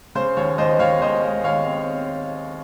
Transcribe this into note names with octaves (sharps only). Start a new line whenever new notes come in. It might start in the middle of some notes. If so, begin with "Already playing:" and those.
C#3 C5
D#2 C#5
D#2 C5 D#5
D#2 C#5 F5
G#3 C5 D#5
G#3
D#2 C#5 F5
C4